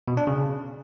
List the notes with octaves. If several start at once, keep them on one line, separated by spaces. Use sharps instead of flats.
B2
D4
C#3